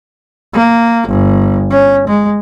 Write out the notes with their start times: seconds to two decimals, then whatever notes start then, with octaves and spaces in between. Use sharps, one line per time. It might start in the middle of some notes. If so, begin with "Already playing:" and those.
0.54 A#3
1.09 G1
1.71 C#4
2.08 G#3